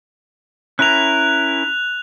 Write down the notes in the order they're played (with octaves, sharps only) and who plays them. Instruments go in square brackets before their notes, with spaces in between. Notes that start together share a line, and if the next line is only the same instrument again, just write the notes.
[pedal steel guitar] C#4 E4 A#4 [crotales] F#6 F7